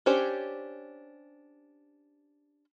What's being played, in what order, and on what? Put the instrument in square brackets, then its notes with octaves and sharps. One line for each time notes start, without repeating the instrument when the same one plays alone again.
[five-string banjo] C#4 D4 G4 C5 C#5